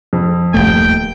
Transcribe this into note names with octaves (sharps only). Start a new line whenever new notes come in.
F2
D#1 C#2 A3 G5